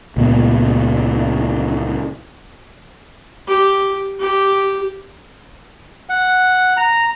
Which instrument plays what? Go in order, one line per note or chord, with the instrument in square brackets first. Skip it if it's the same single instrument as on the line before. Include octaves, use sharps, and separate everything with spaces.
[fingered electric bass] C#2 A#2 B3
[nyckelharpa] G4
G4
[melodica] F#5
A#5